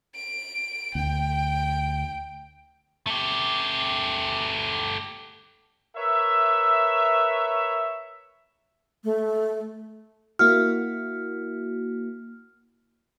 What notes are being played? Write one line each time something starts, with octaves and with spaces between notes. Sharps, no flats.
D7
D2 G5
A3 G4
A#4 B4 C#5 E5
A3
A#3 E4 F#4 F6